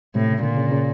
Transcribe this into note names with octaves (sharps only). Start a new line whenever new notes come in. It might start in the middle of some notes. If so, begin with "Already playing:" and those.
A2 C3
C#3
A#2 D3
C#3
C#3